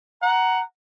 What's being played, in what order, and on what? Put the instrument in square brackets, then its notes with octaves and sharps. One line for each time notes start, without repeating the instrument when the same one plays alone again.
[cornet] F#5 [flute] A#5